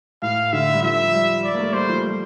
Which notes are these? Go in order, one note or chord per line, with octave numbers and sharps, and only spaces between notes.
A2 F5
D3 E5
G3
F3 E5
G3
D5
A#3
A3
G3 C5
F3
G3